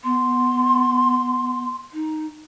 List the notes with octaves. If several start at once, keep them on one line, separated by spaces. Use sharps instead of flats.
B3 C6
D#4